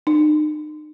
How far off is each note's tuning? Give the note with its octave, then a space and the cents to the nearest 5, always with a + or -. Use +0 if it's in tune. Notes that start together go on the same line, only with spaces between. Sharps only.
D#4 -40